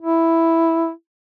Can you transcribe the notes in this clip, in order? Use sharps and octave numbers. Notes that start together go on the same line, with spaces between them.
E4